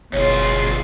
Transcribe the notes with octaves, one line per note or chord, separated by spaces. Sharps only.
F#1 D2 B2 F4 G#4 C#5